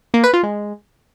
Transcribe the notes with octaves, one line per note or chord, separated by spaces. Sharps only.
A#3
B4
F4
G#3